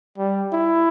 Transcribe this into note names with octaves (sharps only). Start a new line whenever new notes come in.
G3
E4